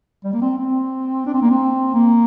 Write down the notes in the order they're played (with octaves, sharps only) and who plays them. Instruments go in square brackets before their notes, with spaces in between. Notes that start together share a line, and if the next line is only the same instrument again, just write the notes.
[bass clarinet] G3
A#3
C4
C4
D4
C4
A#3
C4
A#3